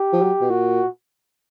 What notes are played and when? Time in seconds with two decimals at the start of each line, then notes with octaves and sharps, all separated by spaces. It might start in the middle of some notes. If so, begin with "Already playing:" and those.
Already playing: G4
0.13 F3
0.22 F#3
0.41 B2
0.50 A#2 F#4